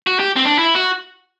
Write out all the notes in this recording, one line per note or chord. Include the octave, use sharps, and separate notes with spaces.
F#4
G4
C4
D4
E4
F#4